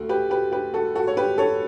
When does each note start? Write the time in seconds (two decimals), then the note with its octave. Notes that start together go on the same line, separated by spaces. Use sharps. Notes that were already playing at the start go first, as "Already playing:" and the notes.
Already playing: D2 A3 F#4
0.09 G4 B4
0.30 G4 B4
0.52 G4 B4
0.74 F#4 A4
0.95 F#4 A4
1.07 C#5
1.17 G4 B4
1.38 A4 C#5